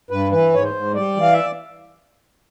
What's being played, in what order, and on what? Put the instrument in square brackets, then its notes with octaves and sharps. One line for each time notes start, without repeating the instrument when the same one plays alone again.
[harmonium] G2 B4
E3 B4
G#2 C#5
C5
G#2
G3 D5
E3 F5
E5